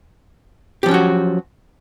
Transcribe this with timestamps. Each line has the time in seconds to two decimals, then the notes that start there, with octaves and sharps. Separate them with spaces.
0.83 G4
0.86 F3
0.88 C#4
0.91 F#3
0.94 F#4